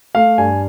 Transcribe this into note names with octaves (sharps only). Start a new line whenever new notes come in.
A3 F5
G2 G#5